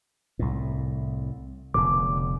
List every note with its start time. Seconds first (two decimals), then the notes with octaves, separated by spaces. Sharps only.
0.39 C2 A2
1.74 F1 B2 D3 D6